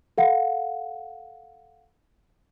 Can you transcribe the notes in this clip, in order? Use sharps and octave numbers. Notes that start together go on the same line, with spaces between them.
A4 F5 F#5